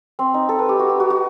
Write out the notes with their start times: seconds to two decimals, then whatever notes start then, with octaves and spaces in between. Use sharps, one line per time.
0.19 C4
0.34 D#4
0.49 A4
0.59 B4
0.69 G4
0.79 F#4
0.89 G4
1.00 F#4
1.10 F#4